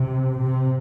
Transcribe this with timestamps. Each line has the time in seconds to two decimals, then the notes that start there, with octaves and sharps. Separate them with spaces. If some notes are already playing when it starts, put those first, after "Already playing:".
Already playing: C3
0.41 C3